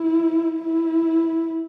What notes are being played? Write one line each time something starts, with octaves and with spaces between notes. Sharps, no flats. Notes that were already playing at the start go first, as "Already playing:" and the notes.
Already playing: E4
E4